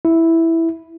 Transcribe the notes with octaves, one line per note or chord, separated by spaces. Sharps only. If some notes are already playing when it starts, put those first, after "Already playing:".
E4